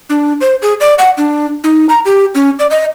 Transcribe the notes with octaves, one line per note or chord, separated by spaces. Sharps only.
D4
C5
G#4
D5
F#5
D4
D#4
A#5
G4
C#4
D5
D#5